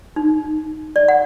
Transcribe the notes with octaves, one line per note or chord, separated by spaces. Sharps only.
D#4
D5
F#5